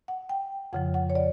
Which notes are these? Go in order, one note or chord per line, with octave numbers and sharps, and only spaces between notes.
F#5
G5
F2 C#3 F3 F#5
F#5
C#5
D5